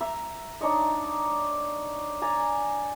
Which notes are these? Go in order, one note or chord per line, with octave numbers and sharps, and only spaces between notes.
E5 A#5 B5
D4 D#4 C#5 D#5
D5 G#5 A#5